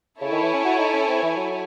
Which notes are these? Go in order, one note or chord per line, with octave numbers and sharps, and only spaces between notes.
C#3 E4 A4 C#5 G#5
D#3
E3
C#4
F#4
D#4
C#4
C4
E3
F#3